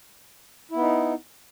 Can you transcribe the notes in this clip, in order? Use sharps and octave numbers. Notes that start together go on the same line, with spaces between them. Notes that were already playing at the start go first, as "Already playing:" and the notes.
B3 D#4 E4